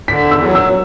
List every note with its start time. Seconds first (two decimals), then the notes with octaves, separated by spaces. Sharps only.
0.08 D3 B6
0.26 E2
0.31 E6
0.43 F#3
0.55 E6